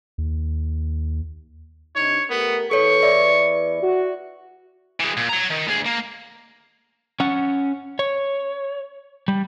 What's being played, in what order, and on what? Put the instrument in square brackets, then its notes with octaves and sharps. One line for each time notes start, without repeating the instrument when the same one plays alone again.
[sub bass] D#2
[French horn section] C3 D4 D#4 [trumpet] C#5
[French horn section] A3 G4 A#4 [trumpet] B3
[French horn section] E2 E4 B4 [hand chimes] A4 C#5 [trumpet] C#6
[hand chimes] D5 E5
[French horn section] F#4
[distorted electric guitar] E3 G#3
A#2
C#5 A#5
D#3
D2 G#4
A#3
[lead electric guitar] C#4 F#5
C#5
G3